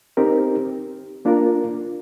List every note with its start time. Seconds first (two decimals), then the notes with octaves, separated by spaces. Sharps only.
0.17 C4 D#4 G4 A#4
1.25 A#3 D4 F4 A#4